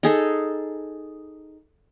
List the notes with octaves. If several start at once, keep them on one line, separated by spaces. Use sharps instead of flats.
D#4 G#4 A4